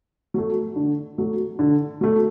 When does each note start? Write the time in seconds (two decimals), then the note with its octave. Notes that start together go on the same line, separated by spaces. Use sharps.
0.34 F#3 A3
0.76 D3
1.18 F#3 A3
1.59 D3
2.01 F#3 A3